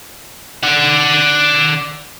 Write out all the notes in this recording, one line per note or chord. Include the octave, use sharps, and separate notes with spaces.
D5 F#5